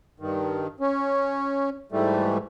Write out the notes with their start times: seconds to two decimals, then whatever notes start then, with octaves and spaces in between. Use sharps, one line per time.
0.20 G2 D#3
0.80 C#4
1.92 G#2 E3 G3 A3